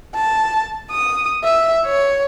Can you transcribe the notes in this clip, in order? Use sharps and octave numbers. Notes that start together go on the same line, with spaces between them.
A5
D#6
E5
C#5